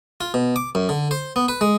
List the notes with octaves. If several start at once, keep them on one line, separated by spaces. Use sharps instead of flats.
F4
B2
D6
F#2
D3
C5
B3
B4
G#3